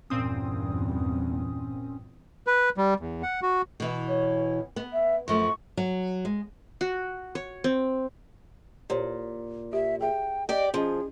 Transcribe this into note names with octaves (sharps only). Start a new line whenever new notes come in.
E2 G2 A#2 C4 C#4 D#6
B4
G3
E2
F#5
F#4
B2 E3
C#5
B3
E5
F#2 F3 A3 C#6
F#3
G#3
F#4
C#5
C4
A#2 G4 C5 C#5
G4 E5
G#4 E5 G5
G4 D5 D#5
F3 C#4 G#4 D#5